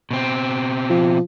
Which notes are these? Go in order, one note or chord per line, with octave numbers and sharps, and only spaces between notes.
B2 C4
F3